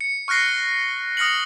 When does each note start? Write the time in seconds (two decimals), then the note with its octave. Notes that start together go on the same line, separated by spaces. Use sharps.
0.01 C#7
0.28 C#6 F6 F#6 A#6 C7
1.17 D#6 F6 A#6 C#7 F#7